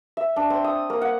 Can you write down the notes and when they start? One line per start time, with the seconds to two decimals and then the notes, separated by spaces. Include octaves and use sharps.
0.17 E5
0.36 D4
0.50 C4
0.64 D#6
0.90 A#3
1.01 F#5